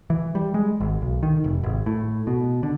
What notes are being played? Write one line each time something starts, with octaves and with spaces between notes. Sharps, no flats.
E3
G3
G#3
G#1
B1
D#3
F1
G#1
A2
B2
D3